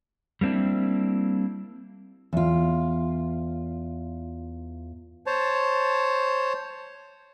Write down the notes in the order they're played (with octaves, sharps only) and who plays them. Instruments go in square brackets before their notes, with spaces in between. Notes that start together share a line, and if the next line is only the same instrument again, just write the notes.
[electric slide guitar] G3 A#3 C4 D4 E4
[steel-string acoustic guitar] E2 F4
[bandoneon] C5 C#5 A5